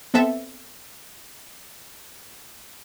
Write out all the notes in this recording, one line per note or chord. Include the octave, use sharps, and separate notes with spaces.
B3 C4 A4 E5